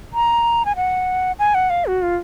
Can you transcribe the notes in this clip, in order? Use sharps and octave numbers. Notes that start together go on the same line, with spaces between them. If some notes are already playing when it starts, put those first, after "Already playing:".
A#5
G#5
F#5
G#5
F#5
F5
F#4
F4